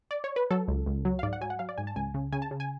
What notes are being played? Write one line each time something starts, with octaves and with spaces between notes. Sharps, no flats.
D5
C#5
B4
F#3 A4
C#2
C#2
F#3
F5
G#2 D5
F#5
F#3 G#5
F#5
F#3 F5
D5
G#2 G#5
A5
C#2 G#5
C#3
C#3 G#5
A5
C#3
G#5